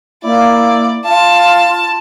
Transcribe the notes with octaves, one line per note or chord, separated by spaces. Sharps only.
A#3 E4 D5
F4 F5 A5